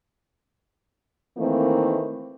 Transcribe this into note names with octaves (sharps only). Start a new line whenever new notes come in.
D#3 E3 A3 A#3 C4